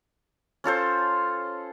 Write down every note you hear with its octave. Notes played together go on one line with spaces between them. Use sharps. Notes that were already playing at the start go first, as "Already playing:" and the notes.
C#4 F4 A4 C5